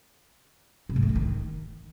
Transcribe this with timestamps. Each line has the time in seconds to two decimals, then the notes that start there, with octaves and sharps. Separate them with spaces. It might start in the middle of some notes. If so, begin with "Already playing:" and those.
0.89 C3
0.96 G#2
1.02 A3
1.09 D3
1.15 D#3